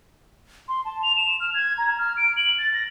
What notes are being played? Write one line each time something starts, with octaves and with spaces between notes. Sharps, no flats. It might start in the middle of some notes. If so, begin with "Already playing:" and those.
C6
A5
F7
E7
F6
G#6
A#5
F6
D7
F#7
A6
A#6